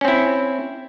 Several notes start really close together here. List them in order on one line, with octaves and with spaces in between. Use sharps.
C#4 C4 E4